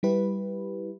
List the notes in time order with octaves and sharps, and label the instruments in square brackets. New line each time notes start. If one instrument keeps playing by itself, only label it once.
[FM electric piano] G3 E4 G4 B4